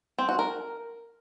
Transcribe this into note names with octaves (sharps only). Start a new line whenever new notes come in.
C4
F#4
A#4